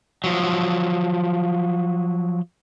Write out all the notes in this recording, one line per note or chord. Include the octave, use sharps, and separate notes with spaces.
F3 F#3